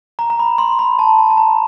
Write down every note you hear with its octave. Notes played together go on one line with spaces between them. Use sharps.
A#5
A#5
B5
C6
B5
A5
A5
A5
A#5